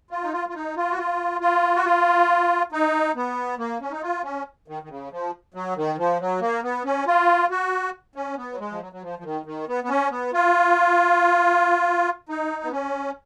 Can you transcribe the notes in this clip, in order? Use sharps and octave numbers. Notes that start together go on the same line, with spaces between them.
F4
D#4
F4
F4
D#4
F4
F#4
F4
F4
F#4
F4
D#4
B3
A#3
C#4
D#4
F4
C#4
D#3
D#3
C#3
F3
F#3
D#3
F3
F#3
A#3
B3
C#4
F4
F#4
C#4
B3
F#3
G#3
F3
F#3
F#3
F3
F3
D#3
D#3
B3
B3
C#4
B3
F4
D#4
B3
C#4